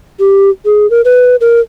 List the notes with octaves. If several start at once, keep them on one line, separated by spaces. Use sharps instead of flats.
G4
G#4
A#4
B4
A#4